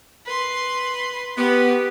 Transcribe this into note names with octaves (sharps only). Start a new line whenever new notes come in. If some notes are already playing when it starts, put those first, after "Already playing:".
B4 C6
B3 G4